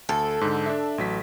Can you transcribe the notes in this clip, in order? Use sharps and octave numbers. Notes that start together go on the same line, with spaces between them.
D2 A4
G#2 D3
D4 E5
A1 F#3 B6